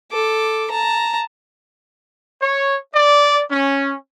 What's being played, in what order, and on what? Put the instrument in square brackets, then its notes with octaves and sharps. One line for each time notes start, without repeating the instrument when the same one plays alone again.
[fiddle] A4 D6
A5 A#5
[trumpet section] C#5
D5
C#4